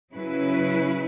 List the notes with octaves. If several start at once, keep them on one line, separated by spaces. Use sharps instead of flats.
C#3 F#3 C#4 E4 B4